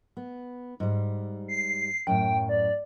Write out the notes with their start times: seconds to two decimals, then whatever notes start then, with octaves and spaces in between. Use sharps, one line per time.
0.17 B3
0.80 G#2 G3
1.48 C7
2.07 F#2 A2 G5
2.49 D5